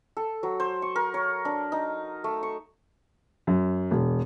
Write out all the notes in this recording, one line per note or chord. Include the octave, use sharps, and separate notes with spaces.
A4
F#3
C5
C#6
A#4
C#5
D4
D#4
A3
C#6
F#2
E1